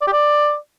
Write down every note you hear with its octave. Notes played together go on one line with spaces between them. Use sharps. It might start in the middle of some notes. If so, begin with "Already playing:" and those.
D5
G4
D5